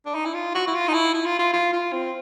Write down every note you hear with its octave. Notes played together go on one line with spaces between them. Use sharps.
D4
D#4
E4
F4
F#4
E4
F4
D#4
E4
E4
F4
F4
F4
F4
C4